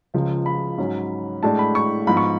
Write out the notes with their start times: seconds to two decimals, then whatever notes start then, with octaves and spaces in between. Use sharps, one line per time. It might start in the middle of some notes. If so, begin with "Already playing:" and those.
0.14 C#2 C#3 F3 G#3
0.46 B5
0.78 G#2 F#3 C#4
1.43 A2 G#3 D4 A5
1.59 B5
1.75 C#6
2.07 G#2 F3 B3 B5
2.17 C#6